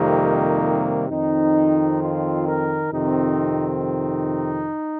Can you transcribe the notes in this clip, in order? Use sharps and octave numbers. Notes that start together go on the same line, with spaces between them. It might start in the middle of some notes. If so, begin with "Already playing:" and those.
Already playing: F2 C3 D#3 G3 A#3 D#4
F2 D#3 C4 D#4
F4
A#4
F2 C3 D#3 C4 D#4
D#4